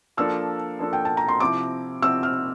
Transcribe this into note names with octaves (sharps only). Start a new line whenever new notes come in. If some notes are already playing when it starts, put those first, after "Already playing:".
F3 A#3 D4 A4 E6
F3 A#3 D4 A4
G5
A5
A#5
C6
C3 F3 C4 E4 D6
C3 F3 C4 E4 E6
F6